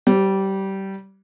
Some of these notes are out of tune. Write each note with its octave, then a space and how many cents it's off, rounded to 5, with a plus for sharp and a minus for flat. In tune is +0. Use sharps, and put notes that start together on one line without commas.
G3 -20 C5 +15